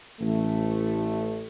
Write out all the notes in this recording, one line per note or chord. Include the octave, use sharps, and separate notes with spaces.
A1 A3